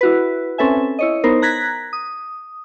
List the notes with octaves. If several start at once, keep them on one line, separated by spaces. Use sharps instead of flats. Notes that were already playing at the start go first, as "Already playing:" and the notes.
E4 F#4 B4
C4 C#4 A4 B4 E5 G#5
E4 C#5 D#5
B3 D#4 A#4 C5
A#5 F#6 G#6 A#6 B6
D#6